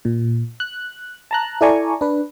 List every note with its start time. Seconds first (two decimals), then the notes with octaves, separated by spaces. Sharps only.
0.05 A#2
0.60 F#6
1.31 A5 A#5 F#6
1.61 E4 A4 D5 G#5 A#5 C#6
2.01 D4 B4